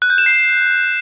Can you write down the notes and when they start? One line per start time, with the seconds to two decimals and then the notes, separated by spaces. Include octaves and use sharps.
0.02 F#6
0.10 G6
0.18 E7
0.26 C7